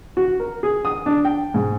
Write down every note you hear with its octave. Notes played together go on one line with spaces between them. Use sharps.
F#4
A#4
G#4
D#6
D4
G5
G#2